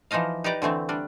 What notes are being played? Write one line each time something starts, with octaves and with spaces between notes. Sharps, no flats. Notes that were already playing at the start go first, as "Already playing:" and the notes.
E3 F3 D#4 D#5 F5
D#4 G4 B4 D5 A#5
D3 E3 A3 C4
G3 D4